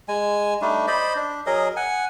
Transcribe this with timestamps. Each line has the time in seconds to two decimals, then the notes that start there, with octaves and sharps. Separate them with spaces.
0.08 G#3 G#5
0.62 G3 A3 D4 D#4
0.87 C5 D5 D#5 B5
1.16 D4
1.46 F#3 G#4 A#4 D#5
1.76 F#5 G#5